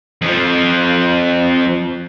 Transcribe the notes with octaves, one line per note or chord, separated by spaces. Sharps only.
F2 F3